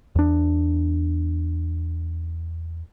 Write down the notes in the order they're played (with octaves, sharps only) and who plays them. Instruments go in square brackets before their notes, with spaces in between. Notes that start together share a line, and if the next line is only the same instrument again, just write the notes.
[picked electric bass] E2 D4